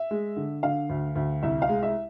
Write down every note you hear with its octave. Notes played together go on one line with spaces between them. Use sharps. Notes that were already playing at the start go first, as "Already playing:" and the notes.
Already playing: E5
G#3
D3
D3 F5
D2
D2
C2 E5
F5
G#3
E5